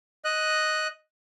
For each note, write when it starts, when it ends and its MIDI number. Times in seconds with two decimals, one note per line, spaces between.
0.25 0.88 75
0.25 0.88 90